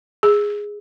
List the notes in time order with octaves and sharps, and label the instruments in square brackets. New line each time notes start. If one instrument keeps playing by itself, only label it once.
[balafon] G#4